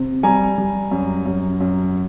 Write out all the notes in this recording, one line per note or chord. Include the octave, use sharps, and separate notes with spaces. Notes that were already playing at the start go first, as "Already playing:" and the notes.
Already playing: C3
G3 G#5 A#5
G3
F#2
F#2
F#2